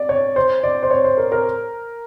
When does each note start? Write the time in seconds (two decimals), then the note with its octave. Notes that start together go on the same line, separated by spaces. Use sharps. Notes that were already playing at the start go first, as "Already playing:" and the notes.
Already playing: D5
0.09 C#5
0.36 C5
0.63 D5
0.83 C5
0.91 C#5
1.04 C5
1.18 A#4
1.32 A#4